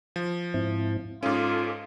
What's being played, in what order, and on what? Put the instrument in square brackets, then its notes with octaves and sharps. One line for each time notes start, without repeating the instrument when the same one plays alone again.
[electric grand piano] F3
[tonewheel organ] G#2 C4 E4
[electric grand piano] G#2 C#4 [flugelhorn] F4 [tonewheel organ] A4 D6 D#6